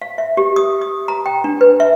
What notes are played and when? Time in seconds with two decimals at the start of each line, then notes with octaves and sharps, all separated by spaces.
0.02 F5
0.18 E5
0.37 G4
0.56 D#6
0.81 D#6
1.08 A#5
1.26 G5
1.44 D4
1.61 B4
1.80 E5